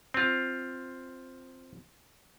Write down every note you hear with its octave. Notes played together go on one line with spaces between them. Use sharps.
C4 F4